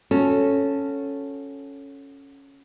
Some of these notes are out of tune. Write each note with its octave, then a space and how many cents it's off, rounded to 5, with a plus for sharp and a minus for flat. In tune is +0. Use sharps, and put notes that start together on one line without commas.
C#4 +0 F#4 -15 A4 +0